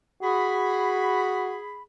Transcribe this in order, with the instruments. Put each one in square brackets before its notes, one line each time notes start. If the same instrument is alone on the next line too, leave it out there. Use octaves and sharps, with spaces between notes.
[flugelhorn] F#4 [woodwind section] G#4 B5